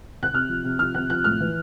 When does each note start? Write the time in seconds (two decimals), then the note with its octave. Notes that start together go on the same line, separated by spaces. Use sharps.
0.23 F#6
0.33 C3 F6
0.49 F3
0.64 C3
0.79 F3 F6
0.95 C3 F#6
1.10 F3 F#6
1.24 A2 F6
1.40 E3